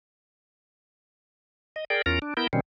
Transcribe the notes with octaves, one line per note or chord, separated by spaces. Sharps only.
D#5
G#4 A#4 D5 G5
E2 C#4 F4 A#4 A#5
D4
B3 E4 A#4 G6
B2 D#3 G3 C4 C#4